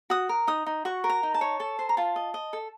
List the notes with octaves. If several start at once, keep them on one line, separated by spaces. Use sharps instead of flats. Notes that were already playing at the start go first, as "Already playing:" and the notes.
F#4 D#6
A#4
D#4 D#6
D#4
F#4 C#6
A#4
A#5
D#4
A5
C#5
A4 A5
C5
A#5
F4 A5
D#5
D#5
A4